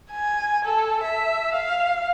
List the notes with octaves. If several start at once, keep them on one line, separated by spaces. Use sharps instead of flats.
G#5
A4
E5
F5